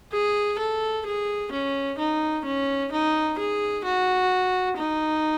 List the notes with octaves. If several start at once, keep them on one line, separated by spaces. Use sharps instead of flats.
G#4
A4
G#4
C#4
D#4
C#4
D#4
G#4
F#4
D#4